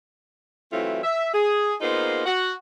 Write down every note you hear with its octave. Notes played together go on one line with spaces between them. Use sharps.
E3 F#3 A3 C4 E4 F4
E5
G#4
A#3 B3 D#4 F4 G#4 C5
F#4 F#5